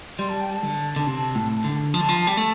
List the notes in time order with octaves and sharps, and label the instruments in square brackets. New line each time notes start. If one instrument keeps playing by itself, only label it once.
[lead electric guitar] G3 [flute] C6
[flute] A5
G5
A5
[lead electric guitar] D3
D3
C3
A2
D3
[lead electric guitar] F3 [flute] A5
[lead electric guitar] D3
[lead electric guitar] F3 [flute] C6
[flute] A5
[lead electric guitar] G3 [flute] G5
[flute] A5
[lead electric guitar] A3